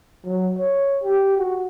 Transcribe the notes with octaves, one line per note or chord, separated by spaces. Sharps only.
F#3
C#5
G4
F#4